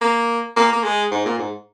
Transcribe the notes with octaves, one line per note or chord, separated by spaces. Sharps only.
A#3
A#3
A#3
G#3
G#2
A#2
G#2